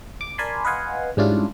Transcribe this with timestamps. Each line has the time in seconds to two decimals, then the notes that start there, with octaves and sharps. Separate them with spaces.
0.21 D6
0.38 A#4 D5 G#5 A5 B5 C6
0.65 B4 D#5 F5 F#5 G#5 C6
1.17 G#2 G3 C#4 D4 E4 F4